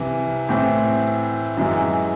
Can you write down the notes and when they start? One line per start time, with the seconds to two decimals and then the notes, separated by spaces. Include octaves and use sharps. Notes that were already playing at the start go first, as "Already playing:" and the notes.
Already playing: C2 C3 E3
0.49 A2 E3 C4
1.57 F#2 E3 G#3